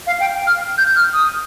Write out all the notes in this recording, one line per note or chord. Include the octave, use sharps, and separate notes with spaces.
F5
G5
F6
G6
F6
D#6